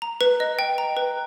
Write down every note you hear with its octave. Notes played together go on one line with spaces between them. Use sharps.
A#5
B4
D#5
G5
A#5
B4